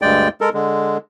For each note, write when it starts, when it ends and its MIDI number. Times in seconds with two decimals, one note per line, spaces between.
0.02 0.28 38
0.02 0.28 43
0.02 0.28 56
0.02 0.28 74
0.02 0.28 79
0.41 0.49 56
0.41 0.49 69
0.41 0.49 70
0.54 0.97 50
0.54 0.97 56